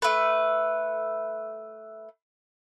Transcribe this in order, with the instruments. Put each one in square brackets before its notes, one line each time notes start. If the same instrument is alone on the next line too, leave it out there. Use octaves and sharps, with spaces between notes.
[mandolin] A3 B4